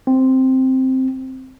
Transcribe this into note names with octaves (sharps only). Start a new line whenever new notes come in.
C4